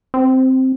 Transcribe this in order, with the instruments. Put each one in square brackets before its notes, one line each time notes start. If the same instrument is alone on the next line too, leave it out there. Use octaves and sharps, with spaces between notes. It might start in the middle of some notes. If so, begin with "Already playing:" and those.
[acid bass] C4